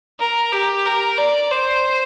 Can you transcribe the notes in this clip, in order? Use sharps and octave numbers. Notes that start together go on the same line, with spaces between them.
A#4
G4
A#4
D5
C5